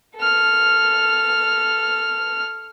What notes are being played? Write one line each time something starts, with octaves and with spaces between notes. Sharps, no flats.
A4 F6